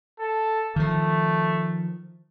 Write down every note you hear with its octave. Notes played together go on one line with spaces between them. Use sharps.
A4
D#3 F3 A3